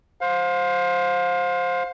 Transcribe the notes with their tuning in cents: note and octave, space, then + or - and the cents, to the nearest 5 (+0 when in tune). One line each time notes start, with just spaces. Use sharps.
C5 +5 F5 +30